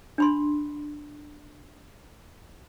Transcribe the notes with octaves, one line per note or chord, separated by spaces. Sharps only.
D4 B5 C6